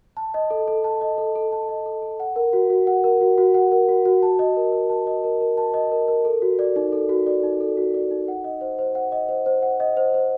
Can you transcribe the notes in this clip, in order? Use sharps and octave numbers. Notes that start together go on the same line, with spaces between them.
A5
D#5
A4
A4
A5
D#5
A4
A4
A5
D#5
A4
A4
F#5
A#4
F#4
F#4
F#5
A#4
F#4
F#4
F#5
A#4
F#4
F#4
A5
D#5
A#4
A#4
A5
D#5
A#4
A#4
A5
D#5
A#4
A#4
A4
F#4
D5
D#4
A4
F#4
D5
D#4
A4
F#4
D5
D#4
F#5
D#5
C5
C5
F#5
D#5
C5
C5
F#5
D#5
C5
C5